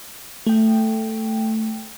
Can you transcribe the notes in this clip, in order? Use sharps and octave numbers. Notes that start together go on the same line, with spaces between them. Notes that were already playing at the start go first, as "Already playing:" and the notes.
A3 G5